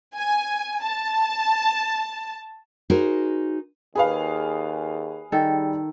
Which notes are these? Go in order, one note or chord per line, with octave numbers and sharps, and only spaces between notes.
G#5
A5
D#4 F#4 G#4 A#4 C5
D#2 G#4 B4 F5
D#3 G3 A4